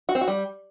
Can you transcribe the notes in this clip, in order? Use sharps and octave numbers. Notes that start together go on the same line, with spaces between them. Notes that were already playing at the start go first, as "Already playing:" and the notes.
F#4
C4
F#4
G3